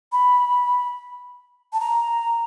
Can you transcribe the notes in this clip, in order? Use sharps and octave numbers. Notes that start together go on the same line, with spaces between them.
B5
A5
A#5